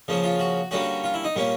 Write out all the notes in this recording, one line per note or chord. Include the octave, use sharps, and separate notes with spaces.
C#3 F3 A#3 C#4
F4
F#4
D3 G3 A#3 C#4 F#4
F4
E4
D#4
A#2 G3 A#3 C#4